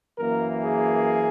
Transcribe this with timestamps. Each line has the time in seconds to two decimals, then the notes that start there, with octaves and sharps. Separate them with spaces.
0.18 F#2 E3 A#3 A#4
0.62 G#4